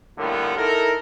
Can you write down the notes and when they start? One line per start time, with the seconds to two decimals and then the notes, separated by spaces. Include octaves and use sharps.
0.18 A2 D3 G3 A#3 B3 F4
0.56 D#4 E4 A4 A#4